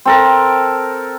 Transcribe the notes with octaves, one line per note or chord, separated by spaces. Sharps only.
C4 A4 A#4